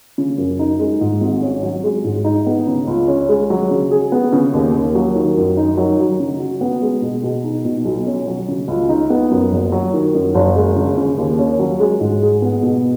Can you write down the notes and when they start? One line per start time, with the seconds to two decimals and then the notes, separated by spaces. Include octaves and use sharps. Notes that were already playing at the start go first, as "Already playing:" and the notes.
0.18 C#3
0.38 F#2
0.59 D#4
0.80 G#3
1.01 G#2
1.21 G#1
1.42 C#4
1.63 F#3
1.84 G#3
2.04 G#2
2.25 D#4
2.46 B3
2.67 C#3
2.88 C#2
3.08 C#4
3.29 G#3
3.50 F#3
3.71 C#3
3.91 G#4
4.12 B3
4.33 C#3
4.53 D#2
4.74 D#2
4.95 F#3
5.15 D#3
5.37 F#2
5.57 D#4
5.77 F#3
5.99 F#3
6.20 C#3
6.40 F#4
6.61 B3
6.82 G#3
7.02 B2
7.23 B2
7.44 D#4
7.65 B2
7.85 B1
8.07 C#4
8.27 F#3
8.48 C#3
8.68 C#2
8.89 D#4
9.10 B3
9.31 F#2
9.52 F#1
9.72 F#3
9.94 D#3
10.15 F#2
10.35 F#1
10.56 G#3
10.76 C#3
10.98 C#3
11.17 D#2
11.39 C#4
11.59 F#3
11.80 G#3
12.00 G#2
12.22 G#4
12.42 B3
12.63 B2